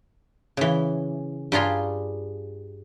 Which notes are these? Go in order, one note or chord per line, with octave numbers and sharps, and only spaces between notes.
C#3 E3
G2 G3 F4 G#4 A#5 C6